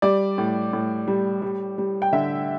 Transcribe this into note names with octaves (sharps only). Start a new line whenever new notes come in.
G3 D5
A2
A2
G3
G3
G3
G5
D3 E5